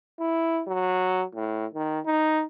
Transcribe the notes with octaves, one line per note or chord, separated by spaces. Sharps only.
E4
F#3
A2
D#3
D#4